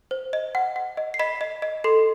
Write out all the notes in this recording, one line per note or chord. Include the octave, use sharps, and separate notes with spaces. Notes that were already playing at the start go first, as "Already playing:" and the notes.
C5
D#5
F#5
F#5
D#5
C7
D#5 B5 B6
D#5
D#5
A4 C6 C7